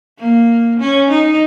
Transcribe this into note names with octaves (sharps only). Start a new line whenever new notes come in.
A#3
C#4
D#4